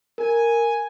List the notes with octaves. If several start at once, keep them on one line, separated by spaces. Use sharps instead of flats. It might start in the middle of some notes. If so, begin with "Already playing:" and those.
A#4 G#5